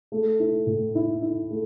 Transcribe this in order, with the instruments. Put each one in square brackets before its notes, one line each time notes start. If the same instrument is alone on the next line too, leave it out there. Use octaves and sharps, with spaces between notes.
[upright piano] A3
E4
A2
E4
E4
A3